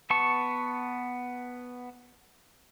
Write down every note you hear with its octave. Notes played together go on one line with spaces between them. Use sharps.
B3 A5 C#6